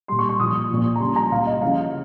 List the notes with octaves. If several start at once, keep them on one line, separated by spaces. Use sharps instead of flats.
A#2 G3 C6
C#6
C#6
A#2 F3 D#6
A#2 F3
A#5
C#3 G3 C6
A#5
A#2 G3 F5
D#5
C#3 F3 F5